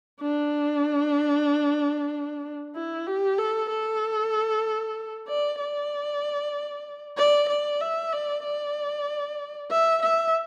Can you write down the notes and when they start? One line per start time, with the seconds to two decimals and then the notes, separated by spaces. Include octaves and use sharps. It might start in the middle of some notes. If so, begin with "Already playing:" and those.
0.22 D4
2.75 E4
3.06 G4
3.38 A4
3.69 A4
5.27 D5
5.60 D5
7.17 D5
7.49 D5
7.81 E5
8.12 D5
8.44 D5
9.71 E5
10.02 E5